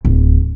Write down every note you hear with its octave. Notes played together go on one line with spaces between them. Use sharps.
D1